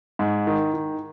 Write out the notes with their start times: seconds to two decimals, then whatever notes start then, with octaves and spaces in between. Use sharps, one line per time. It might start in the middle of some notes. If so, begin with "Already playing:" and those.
0.19 G#2
0.47 D#3
0.74 D#3